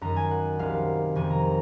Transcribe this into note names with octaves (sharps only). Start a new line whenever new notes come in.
F#2 D#3 A#5
G#5
F#5
C2 C3 D#3 F5
F2 C3 D#3 G#5
A#5
A#5